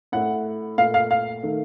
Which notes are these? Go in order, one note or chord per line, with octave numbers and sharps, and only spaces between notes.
A2 A3 F#5
A#2 A3 F5
F5
F5
D#3 A3